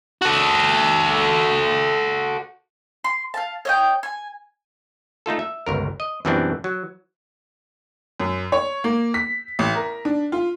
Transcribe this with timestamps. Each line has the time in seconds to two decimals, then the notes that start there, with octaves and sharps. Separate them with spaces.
0.22 F#4 A4
3.04 C6
3.34 F5 A5
3.65 C#5 D#5 G5
4.03 G#5
5.26 A3 D#4 F4 A4
5.39 E5
5.66 G1 C#2 A#4
6.00 D#5
6.25 F#2 B2 E3 G3 C4 D4
6.64 F#3
8.20 F#2
8.52 C#5
8.84 A#3
9.14 B6
9.59 A1
9.75 A#4
10.05 D4
10.32 F4